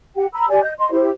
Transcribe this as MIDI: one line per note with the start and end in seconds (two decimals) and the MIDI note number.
0.16 0.26 67
0.16 0.26 78
0.16 0.26 79
0.33 0.47 82
0.33 0.47 83
0.33 0.47 88
0.49 0.62 67
0.49 0.62 74
0.49 0.62 80
0.62 0.72 75
0.62 0.72 91
0.78 0.91 75
0.78 0.91 84
0.91 1.08 64
0.91 1.08 67
0.91 1.08 72